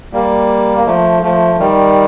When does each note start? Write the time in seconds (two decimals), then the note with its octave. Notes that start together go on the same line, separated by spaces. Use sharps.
0.13 G3 A#3
0.78 A#3
0.86 F3 A3
1.22 F3 A3
1.59 D#3 G3